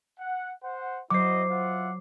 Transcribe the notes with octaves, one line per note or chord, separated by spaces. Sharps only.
F#5
C5 F#5
F#3 E4 F#4 C5 D#5 D6 C7
F4 E5 F#5